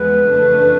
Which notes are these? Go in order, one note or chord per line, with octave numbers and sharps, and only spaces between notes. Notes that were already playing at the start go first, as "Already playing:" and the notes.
Already playing: E2 F3 G#3 B3 B4
F2 C#3 E3 A3 D4